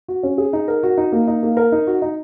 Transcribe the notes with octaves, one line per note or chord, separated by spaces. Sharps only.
F#4
C#4
G#4
D#4
A#4
F#4
D#4
A#3
D#4
A#3
A#4
D#4
F#4
D#4